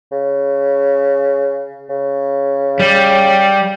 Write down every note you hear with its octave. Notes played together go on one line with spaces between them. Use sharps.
C#3
C#3
G3